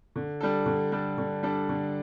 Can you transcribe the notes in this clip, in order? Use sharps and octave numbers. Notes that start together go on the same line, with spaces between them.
D3
G3 D4 A4
D3
G3 D4 A4
D3
G3 D4 A4
D3